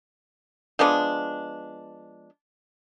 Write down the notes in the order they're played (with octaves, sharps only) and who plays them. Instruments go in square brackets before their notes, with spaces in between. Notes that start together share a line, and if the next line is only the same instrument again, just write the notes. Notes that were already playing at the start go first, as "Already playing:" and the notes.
[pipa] F3 G#3 B3 D4